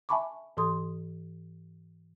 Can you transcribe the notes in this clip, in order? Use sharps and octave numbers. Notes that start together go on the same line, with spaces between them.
E5 G#5 A5 B5 C#6 D6
G#2 E3 A4 C6 D#6